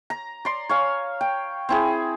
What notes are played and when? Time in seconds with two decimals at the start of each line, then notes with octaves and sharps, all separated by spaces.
0.10 A#5
0.45 D5 C6
0.69 C#5 F5 G#5
1.21 G5
1.69 C4 E4 G#4